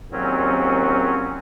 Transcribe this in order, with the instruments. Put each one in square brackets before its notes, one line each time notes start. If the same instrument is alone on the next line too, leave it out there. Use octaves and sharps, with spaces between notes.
[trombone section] A#1 D#2 A#2 [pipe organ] F#3 C4 C#4